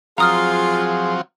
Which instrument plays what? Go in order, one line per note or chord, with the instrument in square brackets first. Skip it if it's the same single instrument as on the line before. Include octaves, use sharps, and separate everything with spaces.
[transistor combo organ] F3 F#3 C4 [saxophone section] F4 [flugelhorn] G#4 [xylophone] A#5 D#6 F6